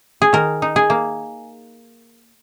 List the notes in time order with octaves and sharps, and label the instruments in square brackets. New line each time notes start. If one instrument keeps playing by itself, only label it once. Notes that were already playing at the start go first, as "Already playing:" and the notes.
[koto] G#4
D#3 A#4
D#4
G#4
A#3